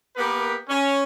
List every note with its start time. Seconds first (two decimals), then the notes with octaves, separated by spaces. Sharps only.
0.16 A#3 B3 G4 A#4 B4
0.68 C#4